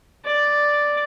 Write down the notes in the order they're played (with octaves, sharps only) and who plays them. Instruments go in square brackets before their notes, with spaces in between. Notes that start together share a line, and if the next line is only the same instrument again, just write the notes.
[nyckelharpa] D5